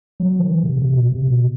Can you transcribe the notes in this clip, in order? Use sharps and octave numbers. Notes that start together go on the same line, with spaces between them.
F#3
D#3
E3
C3
C3
B2
C3
B2